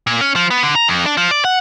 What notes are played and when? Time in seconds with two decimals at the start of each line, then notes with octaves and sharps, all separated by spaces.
0.07 A#2
0.21 C#4
0.36 F3
0.50 B3
0.63 D3
0.75 A#5
0.88 F2
1.06 D4
1.17 F3
1.31 D5
1.44 F#5